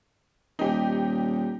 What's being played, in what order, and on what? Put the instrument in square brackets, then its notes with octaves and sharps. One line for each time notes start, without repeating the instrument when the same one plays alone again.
[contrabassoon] D#1 [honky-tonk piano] D#4 G4